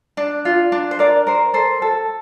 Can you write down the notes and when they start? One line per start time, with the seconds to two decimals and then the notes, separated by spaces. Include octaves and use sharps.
0.17 D4
0.45 F4
0.72 D4
0.91 C5
0.99 A#4 D5
1.27 A#4 C5
1.54 A4 C5
1.82 A4